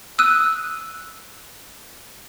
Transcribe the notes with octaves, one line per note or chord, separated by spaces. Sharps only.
D#6 E6 F#6 D#7